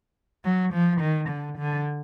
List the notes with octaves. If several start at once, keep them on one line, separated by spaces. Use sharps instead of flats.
F#3
F3
D#3
D3
D3